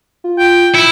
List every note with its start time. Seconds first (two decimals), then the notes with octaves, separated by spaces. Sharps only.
0.24 F4
0.38 G5
0.75 E4